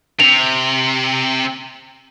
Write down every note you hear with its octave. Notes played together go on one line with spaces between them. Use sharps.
C3 F7